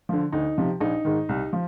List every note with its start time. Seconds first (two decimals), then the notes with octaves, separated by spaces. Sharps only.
0.09 D3 F3
0.32 D2 D#4
0.58 C3 F3
0.80 A#1 D#4
1.05 G#2 D#3
1.29 C2
1.53 F3